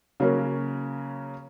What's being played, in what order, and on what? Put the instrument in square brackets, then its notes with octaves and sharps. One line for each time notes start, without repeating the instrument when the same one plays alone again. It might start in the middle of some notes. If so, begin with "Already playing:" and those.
[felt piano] C#3 F#3 A#3 C#4 F#4 A#4